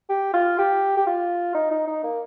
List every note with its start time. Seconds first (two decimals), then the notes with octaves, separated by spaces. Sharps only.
0.09 G4
0.34 F4
0.58 G4
0.97 G4
1.06 F4
1.55 D#4
1.71 D#4
1.87 D#4
2.03 A#3